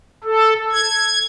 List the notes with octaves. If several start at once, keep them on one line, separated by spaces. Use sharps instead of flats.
A4
G#6